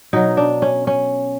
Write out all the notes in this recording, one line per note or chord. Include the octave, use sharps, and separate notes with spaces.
B2 F#3 D#4
D4
C#4
C#4